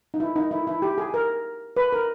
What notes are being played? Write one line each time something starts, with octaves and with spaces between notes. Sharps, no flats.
D#4
E4
D#4
E4
E4
G4
G#4
A#4
B4
A#4